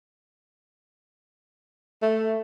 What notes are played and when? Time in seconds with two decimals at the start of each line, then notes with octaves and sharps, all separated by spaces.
2.02 A3